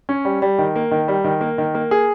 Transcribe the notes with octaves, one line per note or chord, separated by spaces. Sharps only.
C#4
G3
G3
D#3
A#3
D#3
G3
D#3
A#3
D#3
A#3
G#4